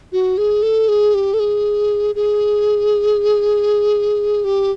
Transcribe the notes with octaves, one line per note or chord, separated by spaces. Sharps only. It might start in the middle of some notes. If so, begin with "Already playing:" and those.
F#4
G#4
A4
G#4
G4
A4
G#4
G#4
G4